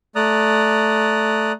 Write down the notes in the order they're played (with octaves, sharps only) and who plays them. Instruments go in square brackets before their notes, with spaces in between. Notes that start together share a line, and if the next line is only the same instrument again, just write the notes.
[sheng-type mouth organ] A3 D5 A#5 D#6 F#6